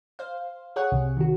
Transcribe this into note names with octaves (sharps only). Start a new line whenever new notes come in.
C5 F5
G#4 C#5 F#5
C2 C3
D#3 F#4